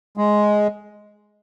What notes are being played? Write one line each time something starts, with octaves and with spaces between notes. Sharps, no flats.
G#3